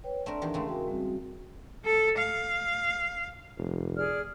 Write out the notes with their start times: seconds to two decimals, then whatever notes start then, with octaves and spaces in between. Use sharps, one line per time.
0.04 B4 C#5 G5
0.26 A3 C4 D4 A#4 D5
0.41 E2 D#3 D4 G4
0.54 C#3 G#3 A3
0.68 F#4 A#4 G5
0.88 G3 C4 F#4
1.84 A4
2.18 F5
3.58 F1
3.96 G#4 D5 F6